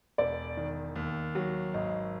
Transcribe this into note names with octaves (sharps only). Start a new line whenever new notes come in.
E1 D5
D#3
D#2
F#3
G#1 D#5